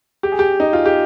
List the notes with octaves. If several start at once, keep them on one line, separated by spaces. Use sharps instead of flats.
G4
G#4
G4
D#4
F4
G4